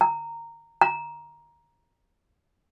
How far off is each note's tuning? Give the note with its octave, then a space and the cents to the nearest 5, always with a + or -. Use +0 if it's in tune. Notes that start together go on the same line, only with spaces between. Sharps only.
A#5 -15
A#5 +10